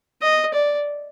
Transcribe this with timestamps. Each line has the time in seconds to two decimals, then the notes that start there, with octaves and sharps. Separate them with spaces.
0.22 D#5
0.54 D5